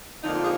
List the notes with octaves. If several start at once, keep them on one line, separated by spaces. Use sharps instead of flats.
F2 D3 F3 A#3 D#4
F4
G#4